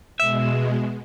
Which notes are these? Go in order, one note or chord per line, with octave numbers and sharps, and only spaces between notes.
B2 G#3 E5